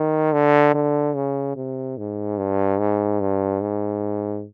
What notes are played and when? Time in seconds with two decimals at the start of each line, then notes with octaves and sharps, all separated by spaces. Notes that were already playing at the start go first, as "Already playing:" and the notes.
Already playing: D#3
0.33 D3
0.75 D3
1.15 C#3
1.56 C3
1.98 G#2
2.38 G2
2.79 G#2
3.20 G2
3.61 G#2